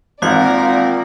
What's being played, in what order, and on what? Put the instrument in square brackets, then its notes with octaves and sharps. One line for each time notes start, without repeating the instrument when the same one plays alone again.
[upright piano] G#1 [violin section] A#3 A#4 D5 [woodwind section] C4 [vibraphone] F4 F5 F#5